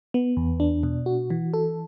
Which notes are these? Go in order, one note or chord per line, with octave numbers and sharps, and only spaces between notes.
B3
E2
D4
B2
F#4
E3
A4